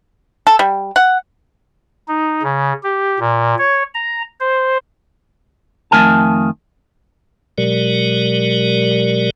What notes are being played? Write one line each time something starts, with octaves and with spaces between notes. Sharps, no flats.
A4
G3
F#5
D#4
C#3
G4
A#2
C#5
A#5
C5
F2 D#3 A3 A#4 G#5 A5
B2 F#3 G#3 G4 A#4 D5